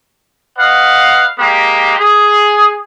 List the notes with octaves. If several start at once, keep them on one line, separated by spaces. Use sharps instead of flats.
B4 D#5 F5 F#5
G#3 A#3 G4
G#4